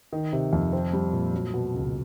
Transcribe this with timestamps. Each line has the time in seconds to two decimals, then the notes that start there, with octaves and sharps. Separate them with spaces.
0.13 D#3
0.33 C3
0.53 F2
0.73 C4
0.93 G3
1.13 A#2
1.34 F#3
1.54 B2
1.74 C#2